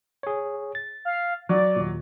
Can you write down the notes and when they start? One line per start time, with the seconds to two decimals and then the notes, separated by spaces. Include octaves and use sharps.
0.23 G#4 C#5
0.75 A6
1.05 F5
1.49 F#3 D5
1.76 D#2 A#2